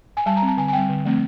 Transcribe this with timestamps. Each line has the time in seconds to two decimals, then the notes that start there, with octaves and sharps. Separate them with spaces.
0.17 G#5
0.26 G3 A5
0.37 A#5
0.42 C4
0.48 A5
0.57 D3 G#5
0.68 G#5
0.73 G3 C4 G5
0.89 D3
1.05 F3 A3 C4